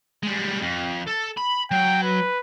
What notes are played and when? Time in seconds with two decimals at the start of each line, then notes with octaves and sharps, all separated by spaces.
0.23 G3 G#3
0.61 F2
1.06 A4
1.37 B5
1.71 F#3 G5
2.03 B4